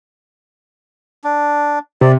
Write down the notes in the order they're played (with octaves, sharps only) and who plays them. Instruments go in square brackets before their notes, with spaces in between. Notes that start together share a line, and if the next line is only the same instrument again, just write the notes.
[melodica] D4
[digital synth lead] C3 [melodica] D5